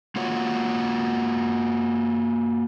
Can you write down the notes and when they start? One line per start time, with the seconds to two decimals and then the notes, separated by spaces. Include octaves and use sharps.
0.16 A#3 F4 F#4 C#5